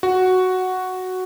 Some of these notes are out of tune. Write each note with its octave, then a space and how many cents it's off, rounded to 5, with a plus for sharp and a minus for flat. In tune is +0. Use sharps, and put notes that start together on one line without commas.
F#4 +0